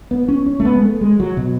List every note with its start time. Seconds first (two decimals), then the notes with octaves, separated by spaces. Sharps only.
0.11 B3
0.28 C#4
0.46 C#4
0.60 A3
0.65 B3
0.75 G#3
0.83 A3
1.01 G#3
1.20 F#3
1.37 B2